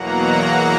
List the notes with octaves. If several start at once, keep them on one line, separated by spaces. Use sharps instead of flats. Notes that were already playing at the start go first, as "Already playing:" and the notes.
Already playing: E2 B2 F#3 A#3 F#5 A#5